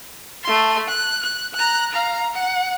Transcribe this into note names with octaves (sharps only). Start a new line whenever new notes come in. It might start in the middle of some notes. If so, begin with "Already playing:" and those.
A3 C6
F#6
F#6
A#5 F#6
F5 A#5
F#5